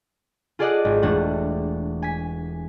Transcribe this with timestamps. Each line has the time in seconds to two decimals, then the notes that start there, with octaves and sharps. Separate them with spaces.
0.59 F4 G#4 A4 D5 D#5 F#5
0.85 G#1
1.02 E1 A3 D4 F#5
2.02 G#5 B6